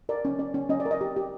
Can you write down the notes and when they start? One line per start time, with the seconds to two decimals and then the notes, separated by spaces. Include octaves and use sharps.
0.09 A#4 D5
0.25 C#4
0.39 C#4 D5
0.54 C#4
0.70 C#4 D#5
0.80 D5
0.86 A#4
0.91 D#5
1.01 G4
1.16 G4